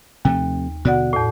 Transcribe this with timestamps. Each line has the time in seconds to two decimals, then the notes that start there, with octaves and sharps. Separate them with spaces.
0.25 D#2 C3 F3 A3
0.85 B2 D3 F#4 D5 F#5
1.13 E2 A2